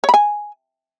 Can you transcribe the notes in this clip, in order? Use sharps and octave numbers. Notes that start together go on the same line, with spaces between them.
C#5
B5
G#5